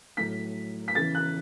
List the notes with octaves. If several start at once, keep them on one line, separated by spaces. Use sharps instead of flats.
A2 F#3 B6
B6
C#3 E3 A6
F#6